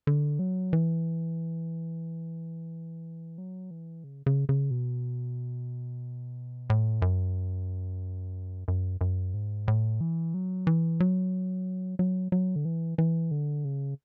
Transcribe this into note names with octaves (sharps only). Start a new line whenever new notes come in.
D3
F#3
E3
F#3
E3
C#3
C#3
C#3
B2
A2
F#2
F#2
F#2
G#2
A2
E3
F#3
E3
F#3
F#3
F#3
D3
E3
E3
D3
C#3